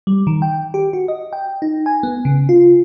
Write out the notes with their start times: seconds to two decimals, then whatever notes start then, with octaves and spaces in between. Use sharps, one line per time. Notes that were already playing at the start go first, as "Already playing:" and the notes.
0.07 G3
0.27 D#3
0.42 G5
0.74 G4
0.93 F#4
1.08 D#5
1.33 G5
1.62 D#4
1.86 G#5
2.03 B3
2.25 C#3
2.49 F4